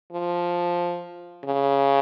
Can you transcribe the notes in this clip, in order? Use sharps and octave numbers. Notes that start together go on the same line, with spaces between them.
F3
C#3